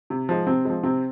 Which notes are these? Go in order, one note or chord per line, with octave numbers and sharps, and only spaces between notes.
C3
F3 G#3
C3 C4
F3 G#3
C3 C4